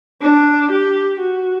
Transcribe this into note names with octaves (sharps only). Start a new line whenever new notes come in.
D4
G4
F#4